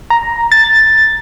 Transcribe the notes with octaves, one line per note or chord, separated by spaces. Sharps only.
A#5
A6